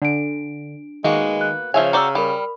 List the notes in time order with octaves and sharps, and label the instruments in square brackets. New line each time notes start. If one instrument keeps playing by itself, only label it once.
[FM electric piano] D3 [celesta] D4 D7
[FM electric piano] D#3 [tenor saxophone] G#3 [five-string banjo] A#3 B3 F#4
[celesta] F#6
[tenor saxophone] C#3 [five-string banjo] F3 E5 G#5 [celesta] C#5 [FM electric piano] F6
[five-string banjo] F#4 G4 D5 [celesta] A#5 E6
[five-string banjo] G3 [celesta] A#4 B5